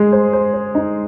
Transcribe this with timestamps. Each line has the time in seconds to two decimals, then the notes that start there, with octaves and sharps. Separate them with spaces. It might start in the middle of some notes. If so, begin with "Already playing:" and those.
Already playing: G#3 G#4
0.13 C5
0.33 C5
0.54 C5
0.75 D#4